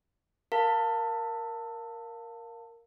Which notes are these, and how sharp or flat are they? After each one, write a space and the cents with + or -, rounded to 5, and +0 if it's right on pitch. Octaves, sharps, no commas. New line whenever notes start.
A#4 +0 F5 +5 A5 +25